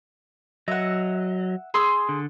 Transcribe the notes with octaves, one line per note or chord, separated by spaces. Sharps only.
F#3 D#5 E5 F#5
G#4 C6 E6
D3